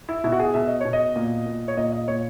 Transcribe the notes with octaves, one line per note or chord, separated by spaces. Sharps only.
E4
B2 E4
F#4
G#4
B2 E5
D#5
B2 C#5
D#5
A#2
A#2
C#5
A#2 D#5
D#5
A#2 C#5